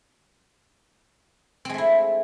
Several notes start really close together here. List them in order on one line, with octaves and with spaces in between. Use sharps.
C4 G#3 A3 E4